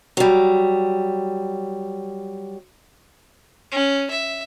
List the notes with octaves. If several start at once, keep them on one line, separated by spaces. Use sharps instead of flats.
F#3 G3
C#4
E5